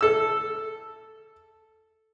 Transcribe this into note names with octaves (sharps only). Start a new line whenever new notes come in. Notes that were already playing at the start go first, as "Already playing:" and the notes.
A4 E6